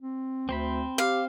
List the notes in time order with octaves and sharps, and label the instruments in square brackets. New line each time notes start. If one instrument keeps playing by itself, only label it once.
[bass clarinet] C4
[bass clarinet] D2 [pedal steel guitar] C4 C5 B5
[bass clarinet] G4 [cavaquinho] F5